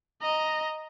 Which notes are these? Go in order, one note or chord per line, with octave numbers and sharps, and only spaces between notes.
D#5 A#5